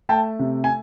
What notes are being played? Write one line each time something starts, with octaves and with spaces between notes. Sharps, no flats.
A3 G5 A5
C3
G#5